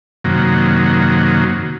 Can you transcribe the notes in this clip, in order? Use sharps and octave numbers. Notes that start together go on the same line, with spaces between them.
F#2 C3 D#3 F#3 A#3